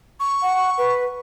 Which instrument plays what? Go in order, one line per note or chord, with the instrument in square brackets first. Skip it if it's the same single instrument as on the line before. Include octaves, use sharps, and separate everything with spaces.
[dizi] C#6
[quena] F#5
B4